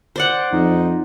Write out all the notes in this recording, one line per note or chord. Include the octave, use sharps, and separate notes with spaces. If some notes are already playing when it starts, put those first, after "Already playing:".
C5 D5 F#5
F2 D#4